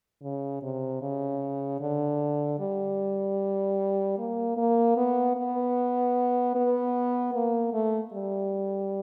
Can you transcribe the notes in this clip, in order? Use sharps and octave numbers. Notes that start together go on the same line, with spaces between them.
C#3
C3
C#3
D3
G3
A#3
A#3
B3
B3
B3
A#3
A3
G3